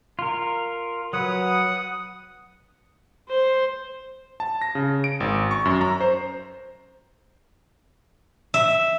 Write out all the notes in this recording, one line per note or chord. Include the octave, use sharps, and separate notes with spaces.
F4 A#4
F#3 B4 F#5 D#6
C5
A5
A#6
C#3
D7
G#1
C#6
F#2
A#5
C5
E5